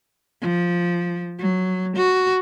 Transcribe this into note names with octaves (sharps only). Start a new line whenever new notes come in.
F3
F#3
F#4